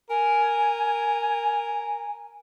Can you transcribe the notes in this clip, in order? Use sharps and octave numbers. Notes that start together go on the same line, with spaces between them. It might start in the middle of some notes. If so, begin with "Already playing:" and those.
A#4 G#5